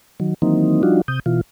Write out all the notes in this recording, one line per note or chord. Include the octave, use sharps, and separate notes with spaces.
D#3 F#3
D#3 E3 F#3 A#3 C4 D#4
F3 G3 D4 D#4 F4 F#4
C3 D#6 G6
B2 E3 F4